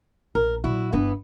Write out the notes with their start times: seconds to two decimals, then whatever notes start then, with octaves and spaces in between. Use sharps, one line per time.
0.35 A#1 A#4
0.64 A#2 F#3 E4 F#4
0.92 G1 E3 B3 D4